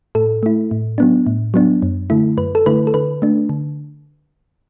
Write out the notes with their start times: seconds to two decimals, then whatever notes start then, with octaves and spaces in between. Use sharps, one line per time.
0.15 A2 A4
0.43 A3 E4
0.71 A2
0.98 F#3 B3 D4
1.26 A2
1.54 F#3 B3 D4
1.82 F#2
2.10 D3 A3 E4
2.37 F#2 B4
2.55 A4
2.66 D3 A3 E4 B4
2.87 A4
2.94 D3 B4
3.22 A3 D4
3.49 D3